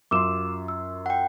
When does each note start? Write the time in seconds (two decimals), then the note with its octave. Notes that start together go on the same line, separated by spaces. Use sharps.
0.11 F#2 F4 C6 D6 E6 E7
0.68 E6
1.06 F#5 G5